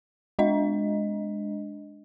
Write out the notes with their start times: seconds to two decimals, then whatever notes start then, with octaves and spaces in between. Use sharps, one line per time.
0.39 G#3 D4 D#5